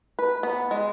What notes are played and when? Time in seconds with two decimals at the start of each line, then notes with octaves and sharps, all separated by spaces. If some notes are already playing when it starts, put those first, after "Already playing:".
0.19 B4
0.43 B3
0.71 G#3